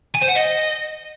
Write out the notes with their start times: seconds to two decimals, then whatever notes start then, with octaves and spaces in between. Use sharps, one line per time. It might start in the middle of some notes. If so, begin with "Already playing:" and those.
0.15 G#5
0.21 C5
0.28 F#5
0.35 D#5